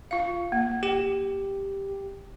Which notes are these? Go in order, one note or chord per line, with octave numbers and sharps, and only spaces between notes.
F4 F5
A#3
G4 G5